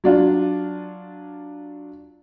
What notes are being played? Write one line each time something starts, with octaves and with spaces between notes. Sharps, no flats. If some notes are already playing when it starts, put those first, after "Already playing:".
F#3 D4 F4